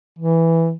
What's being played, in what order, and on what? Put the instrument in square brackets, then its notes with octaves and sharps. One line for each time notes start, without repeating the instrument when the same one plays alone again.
[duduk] E3